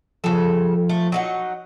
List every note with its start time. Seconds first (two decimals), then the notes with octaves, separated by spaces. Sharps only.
0.24 C#3 F3 A4
0.89 A3
1.12 F#3 D#4 F#5